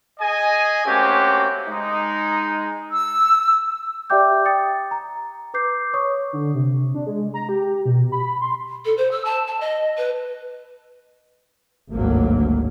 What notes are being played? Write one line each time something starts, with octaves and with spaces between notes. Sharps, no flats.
G#4 D#5 G#5
A3 A#3 C4 C#4 F#4 G4
G#3 D#4
E6
G4 D5 E5 G5 D6 G6
G5 D#6 A6 C#7
A#5
B4 D6 G6 C7
C#5 C#6 D#6
D3
C3
D4
G#3
A#5
G4
B2
B5
C6
A4
C5
E6
A5
A5
D#5
B4
G#1 D2 G2 F#3 A#3